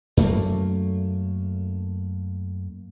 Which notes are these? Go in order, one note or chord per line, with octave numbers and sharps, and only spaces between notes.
F#2 A3 A#3